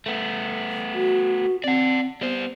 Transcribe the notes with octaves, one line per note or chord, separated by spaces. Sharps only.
A3 B3
F#4
C4 D5 F#5
G3 B3 C5